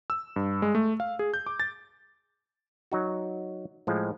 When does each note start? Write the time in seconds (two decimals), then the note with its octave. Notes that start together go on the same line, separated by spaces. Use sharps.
0.10 E6
0.36 G2
0.62 G#3
0.75 A3
1.00 F5
1.19 G#4
1.34 G6
1.46 D6
1.60 A6
2.92 F#3 D#4 F#4
3.87 A2 F3 G#3